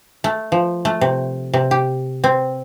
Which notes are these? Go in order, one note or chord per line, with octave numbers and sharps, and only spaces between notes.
A3
F3
A3
C3
C3
G4
C4